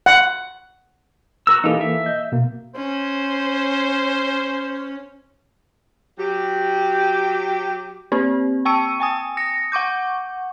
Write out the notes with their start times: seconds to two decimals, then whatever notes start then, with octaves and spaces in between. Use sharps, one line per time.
0.06 F#5
1.47 F#4 A#4 E6
1.64 E3 A#3 D#4 G4 A4
1.81 E5
2.05 D#5 G6
2.32 B2 A#3
2.76 C#4 C5
6.18 F#3 G4
8.12 A#3 C4 G4
8.65 G5 A5 C#6 E6 C#7 D#7
9.00 G5 G#5 D#6
9.37 D#6 A#6 C#7
9.72 F#5 C#6 D6 G6